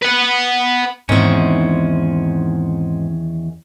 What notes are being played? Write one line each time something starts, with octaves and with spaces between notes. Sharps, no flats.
B4 F#5
E2 G#2 D#3 C4 C#4